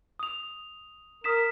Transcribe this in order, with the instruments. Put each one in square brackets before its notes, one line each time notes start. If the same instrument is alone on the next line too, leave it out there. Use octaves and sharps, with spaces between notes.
[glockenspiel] D#6 F7
[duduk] A#4 [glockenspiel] D#6 B6 E7